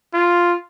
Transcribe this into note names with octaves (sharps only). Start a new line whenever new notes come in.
F4